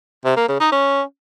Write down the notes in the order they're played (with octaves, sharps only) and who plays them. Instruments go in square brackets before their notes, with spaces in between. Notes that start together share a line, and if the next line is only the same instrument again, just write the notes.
[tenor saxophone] C3
A#3
C#3
D#4
C#4